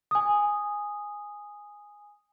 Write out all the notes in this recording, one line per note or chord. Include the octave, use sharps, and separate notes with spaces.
G#5 D#6